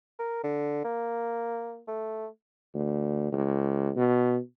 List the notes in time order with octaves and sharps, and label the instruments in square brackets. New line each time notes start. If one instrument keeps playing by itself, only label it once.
[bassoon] A#4
D3
A#3
A3
[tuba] D2
C#2
B2